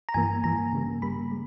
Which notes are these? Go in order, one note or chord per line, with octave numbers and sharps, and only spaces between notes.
A#5
G2 E3 A#3 G#5
G2 E3 A#3 A#5
C#3 G3 A#3
C#3 G3 A#3 B5
G#3